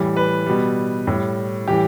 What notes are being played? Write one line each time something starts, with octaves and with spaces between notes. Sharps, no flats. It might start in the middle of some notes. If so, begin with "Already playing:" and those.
Already playing: A2 E3 G3
B4
B2 G3
A2 G3
A2 E3 G3 G4